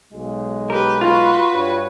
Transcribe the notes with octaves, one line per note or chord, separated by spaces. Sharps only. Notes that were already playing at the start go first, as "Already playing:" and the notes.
B1 G#3
G4 A#4 B4
F4 F#4 B4 C6
G2 C#5